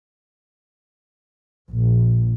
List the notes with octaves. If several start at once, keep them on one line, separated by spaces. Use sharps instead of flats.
A#1